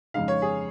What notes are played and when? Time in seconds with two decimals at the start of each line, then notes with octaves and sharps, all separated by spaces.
0.14 F2 C#3 G#3 D#4 F5
0.28 C#5
0.42 G#4